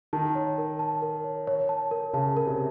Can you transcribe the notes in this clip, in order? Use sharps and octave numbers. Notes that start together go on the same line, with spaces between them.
D#3 A5
C#5
A#4
A5
A#4
C#5
C#5
A5
A#4
C#3 A5
A#4
C3